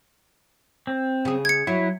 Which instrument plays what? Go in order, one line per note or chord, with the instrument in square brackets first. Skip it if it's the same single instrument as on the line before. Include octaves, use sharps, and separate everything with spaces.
[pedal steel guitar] C4
[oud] C#3 G#4
[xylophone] G#6 C#7
[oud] F#3 [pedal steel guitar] E4